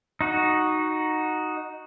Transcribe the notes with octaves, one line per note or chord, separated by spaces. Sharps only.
D#4 F#4